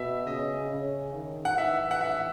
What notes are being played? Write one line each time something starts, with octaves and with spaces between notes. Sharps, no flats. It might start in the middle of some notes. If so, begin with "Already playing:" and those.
Already playing: B2 E5
C#3 D#5
C#3
D#3
F#5
E3 E5
E3 F#5
E5